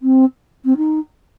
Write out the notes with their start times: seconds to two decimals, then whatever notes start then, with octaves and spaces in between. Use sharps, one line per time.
0.02 C4
0.65 C4
0.77 D#4